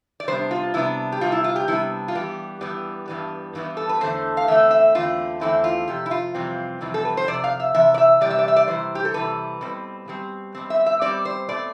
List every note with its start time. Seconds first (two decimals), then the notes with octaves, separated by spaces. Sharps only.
0.20 D5
0.28 C3 G3 B3 D4 C5
0.51 F4
0.74 C3 G3 B3 D4 E4
1.12 G4
1.21 C3 G3 B3 D4 F4
1.32 E4
1.44 F4
1.56 G4
1.67 C3 G3 B3 D4 E4
2.08 F4
2.14 G2 E3 G3 B3 G4
2.61 G2 E3 G3 B3
3.08 G2 E3 G3 B3
3.55 G2 E3 G3 B3
3.77 A4
3.89 B4
4.01 E2 D3 A3 C4 C5
4.37 F5
4.48 E2 D3 A3 C4 E5
4.71 E5
4.95 E2 D3 A3 C4 F4
5.41 E2 D3 A3 C4 E4
5.64 F4
5.88 F2 C3 G4
6.06 E4
6.11 F4
6.34 F2 C3 E3 G3 C4
6.81 F2 C3 E3 G3 C4
6.94 A4
7.05 B4
7.17 C5
7.27 F2 C3 D5
7.44 F5
7.60 E5
7.75 C3 E3 E5
7.94 D5
7.98 E5
8.21 C3 E3 G3 D5
8.30 E5
8.39 D5
8.48 E5
8.56 D5
8.68 C3 E3 G3 C5
8.95 G4
9.05 A4
9.14 C3 E3 G3 B4
9.61 B2 G3 C4
10.08 B2 G3 C4
10.54 B2 G3 C4
10.70 E5
10.86 E5
11.01 B2 G3 C4 D5
11.25 C5
11.49 B2 A3 C4 D5